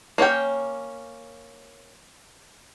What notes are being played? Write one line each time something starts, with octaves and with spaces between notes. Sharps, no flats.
A#3 C#4 C#5 G5